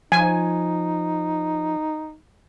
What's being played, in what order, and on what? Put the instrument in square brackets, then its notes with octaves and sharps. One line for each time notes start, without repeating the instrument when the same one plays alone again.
[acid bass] F3 [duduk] D#4 [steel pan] G#5